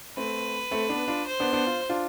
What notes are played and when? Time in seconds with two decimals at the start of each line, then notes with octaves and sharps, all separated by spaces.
0.17 A3 C4 B4
0.71 A3 C4
0.89 B3 D4
1.08 D4 F4
1.27 C5
1.40 B3 D4
1.53 B3 D4
1.67 F4
1.90 D4 F4